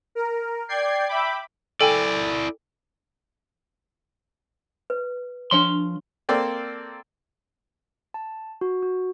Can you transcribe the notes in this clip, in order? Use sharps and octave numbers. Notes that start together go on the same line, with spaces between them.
A#4
D5 G5 G#6 C7
E5 G5 B5 D6
E4 A4 D5 G5 G#5
B4
F3 D4 C#5 C6 C#6
A#3 C4 A4 D5 G5
A5
F#4
F#4